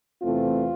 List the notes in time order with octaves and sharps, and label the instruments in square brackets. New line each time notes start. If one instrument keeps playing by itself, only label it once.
[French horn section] E2 C3 E3 A3 C4 F4